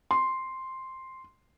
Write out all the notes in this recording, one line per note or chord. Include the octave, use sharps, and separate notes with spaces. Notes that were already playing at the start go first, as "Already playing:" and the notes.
C6